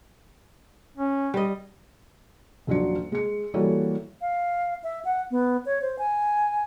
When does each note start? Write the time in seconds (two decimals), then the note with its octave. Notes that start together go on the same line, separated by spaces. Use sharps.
0.97 C#4
1.34 G3 D#5
2.67 D#1 F3 F#3 D4 C#7
3.12 G#3 C#7
3.54 E3 G3 A#3 F#4 A4 C#5
4.21 F5
4.84 E5
5.05 F#5
5.31 B3
5.66 C#5
5.82 C5
5.99 G#5